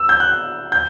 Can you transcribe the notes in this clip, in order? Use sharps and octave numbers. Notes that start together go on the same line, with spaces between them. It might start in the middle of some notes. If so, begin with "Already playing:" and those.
Already playing: E6
G6
F#6
G6